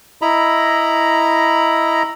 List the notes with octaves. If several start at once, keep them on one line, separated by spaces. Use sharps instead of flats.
E4 D#5 A#5 B5